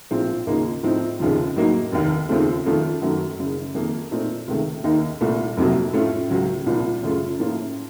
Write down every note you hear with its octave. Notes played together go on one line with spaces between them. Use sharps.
A#1 A2 F3 C4 F4
D#2 C#3 F3 A#3 D#4
A2 F3 C4 D#4
F1 D#2 C#3 F3
A2 F#3 A#3 D#4
F1 D#2 D#3
D#2 C#3 F3 A3 C4
F2 D#3 A3 C#4 F4
F#2 D#3 F#3 A3
F#1 F#2 C#3
F2 D#3 A#3
A#2 A3 C4 D#4
C#2 C3 D#3 A3
D#2 D#3 A#3 D#4
C2 A#2 A3
F1 F2 C3 F#3 A#3
A2 A3 C#4 F4
C#2 C#3 F#3
C2 A#2 F3
F#2 C#3 A3 C#4 F4
A2 F3 A#3 C#4 F4